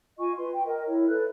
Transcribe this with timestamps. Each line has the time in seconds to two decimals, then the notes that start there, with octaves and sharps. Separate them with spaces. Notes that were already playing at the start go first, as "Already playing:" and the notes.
0.18 F4 D#5 G#5 C#6
0.36 B4 C6
0.52 G5
0.65 A#4 D#5
0.85 E4 C#5
1.07 A4 B4 F#6